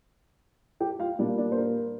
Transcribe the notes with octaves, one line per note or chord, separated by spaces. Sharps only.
G4 G5
F4 F5
A#2 G3 A#3 D4 D5
D4 D5
C5
A#4